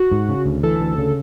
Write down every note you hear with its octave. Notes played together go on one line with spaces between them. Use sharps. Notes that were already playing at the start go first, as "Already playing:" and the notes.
Already playing: F#4
G#2
C#3
D2
E3 A4
D2
C#3